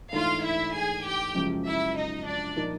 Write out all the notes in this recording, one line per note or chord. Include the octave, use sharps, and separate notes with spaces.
G#2 E3 A3 D4 F4 F5
E4 E5
G#4 G#5
G4 G5
F#2 C#3 F3 G#3
E4 E5
D#4 D#5
D4 D5
A#2 F3 A#3 D#4